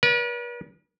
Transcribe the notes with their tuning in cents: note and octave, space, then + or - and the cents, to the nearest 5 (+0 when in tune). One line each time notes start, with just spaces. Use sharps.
B4 -45 D5 -35